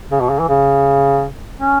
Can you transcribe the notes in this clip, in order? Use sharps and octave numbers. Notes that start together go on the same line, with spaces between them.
C#3
B2
C#3
E3
C#3
C#4